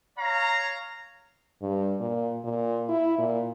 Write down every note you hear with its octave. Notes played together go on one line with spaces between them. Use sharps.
C#5 F5 A#5
G2
A#2
A#2
E4
A#2